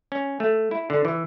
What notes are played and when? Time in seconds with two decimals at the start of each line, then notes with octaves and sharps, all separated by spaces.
0.12 C#4
0.40 A3
0.71 E4
0.90 D3
1.05 E3